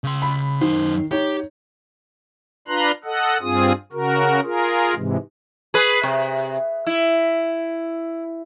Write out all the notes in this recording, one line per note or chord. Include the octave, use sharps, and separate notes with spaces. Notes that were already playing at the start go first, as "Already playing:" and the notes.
C#3 C6
B5
F#2 D#3 C5
D#4 G4 C#5
D4 F4 B4 A#5 C6 F#6
A4 D#5 F#5
G2 C4 F4 G#4 D#6
C#3 F#4 A#4
F4 G#4 A#4
G#2 C3 E3 G#3
G#4 B4
C3
E4